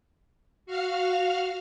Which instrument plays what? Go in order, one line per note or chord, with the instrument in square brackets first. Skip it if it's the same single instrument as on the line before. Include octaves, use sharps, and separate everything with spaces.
[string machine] F#4 F5 F6